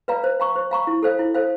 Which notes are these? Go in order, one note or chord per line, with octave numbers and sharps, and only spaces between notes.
B4 D5 F5 A#5
C5
F5 A#5 C#6
C5
F5 A#5 C#6
E4
A4 C5 F5
E4
A4 C5 F5